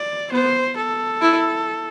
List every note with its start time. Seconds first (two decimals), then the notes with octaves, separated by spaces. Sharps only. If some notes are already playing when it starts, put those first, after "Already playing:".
Already playing: D5
0.32 B3 C5
0.77 A4
1.22 E4